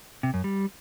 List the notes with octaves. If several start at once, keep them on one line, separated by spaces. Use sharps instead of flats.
C3
F#2
G3